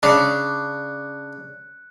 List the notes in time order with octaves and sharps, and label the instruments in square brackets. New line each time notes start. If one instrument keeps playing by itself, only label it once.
[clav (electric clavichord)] C#3 [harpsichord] D4 [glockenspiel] F#6 C#7